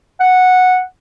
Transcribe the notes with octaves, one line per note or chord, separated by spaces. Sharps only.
F#5